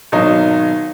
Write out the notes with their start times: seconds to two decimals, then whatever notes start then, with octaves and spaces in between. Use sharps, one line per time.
0.12 G#1 B2 F#3 D#4